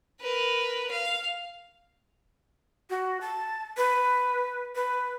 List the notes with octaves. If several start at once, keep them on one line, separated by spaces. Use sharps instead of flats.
A#4 B4
F5
F#4
A5
B4
B4